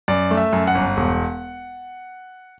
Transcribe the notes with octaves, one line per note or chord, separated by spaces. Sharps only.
F#2 D5
A3
E5
F#2
F#5
G1
E1